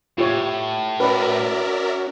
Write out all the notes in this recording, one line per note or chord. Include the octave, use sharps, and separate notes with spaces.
A2 F4 G4 C#5
C#4 F#4 A#4 B4 D5 E5